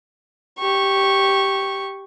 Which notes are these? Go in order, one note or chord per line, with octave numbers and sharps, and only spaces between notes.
G4 C#6